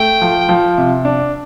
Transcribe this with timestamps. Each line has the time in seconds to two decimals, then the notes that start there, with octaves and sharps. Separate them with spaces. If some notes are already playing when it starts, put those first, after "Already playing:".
Already playing: A3 G5
0.21 F3
0.49 F3
0.78 C3
1.05 D4